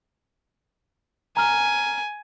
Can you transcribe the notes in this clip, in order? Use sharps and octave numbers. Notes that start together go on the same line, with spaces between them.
G#5 A#5 F6